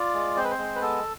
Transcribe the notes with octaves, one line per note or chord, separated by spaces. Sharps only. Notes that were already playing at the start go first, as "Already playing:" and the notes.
Already playing: F4 D5
G#3
C4 C5
B4
C5
G#3
B4
B3 A4